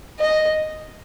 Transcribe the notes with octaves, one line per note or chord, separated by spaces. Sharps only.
D#5